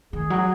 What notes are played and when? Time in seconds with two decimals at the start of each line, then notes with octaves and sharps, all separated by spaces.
0.13 D#3 G#4
0.30 F#3